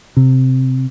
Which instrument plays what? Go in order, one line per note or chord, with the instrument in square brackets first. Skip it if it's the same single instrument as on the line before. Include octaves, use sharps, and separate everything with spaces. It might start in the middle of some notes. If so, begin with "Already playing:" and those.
[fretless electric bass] C3